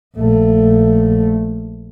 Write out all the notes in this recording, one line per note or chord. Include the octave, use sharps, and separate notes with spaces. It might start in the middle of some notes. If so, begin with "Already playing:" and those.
A#1 A3